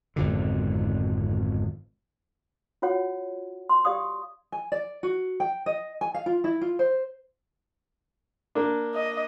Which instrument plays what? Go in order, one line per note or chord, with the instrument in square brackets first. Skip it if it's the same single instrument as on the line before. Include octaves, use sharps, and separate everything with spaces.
[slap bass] G#1 F2 B2 D3
[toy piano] F4 F#4 C#5 F#5
C6
G4 D5 F5 D#6
[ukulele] G#5
D5
F#4
G5
D#5
G#5
F5
F4
E4
F4
C5
[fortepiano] A#3 D4
[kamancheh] D#5